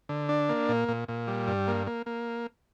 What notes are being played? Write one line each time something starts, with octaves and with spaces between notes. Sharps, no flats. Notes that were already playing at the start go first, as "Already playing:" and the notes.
D3
D4
A#3
A#2
A#2
A#2
G3
G2
A#3
A#3
A#3